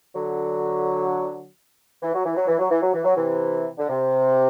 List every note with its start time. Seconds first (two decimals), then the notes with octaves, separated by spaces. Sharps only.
0.15 D3 F#3
2.02 E3
2.13 F#3
2.25 E3
2.36 F#3
2.47 E3
2.59 F#3
2.70 E3
2.81 F#3
2.93 E3
3.04 F#3
3.15 C3 E3
3.78 D3
3.89 C3